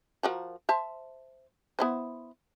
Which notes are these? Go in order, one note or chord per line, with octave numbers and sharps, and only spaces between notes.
F3 F#4 A#4
C5 E5 A5
B3 E4 C5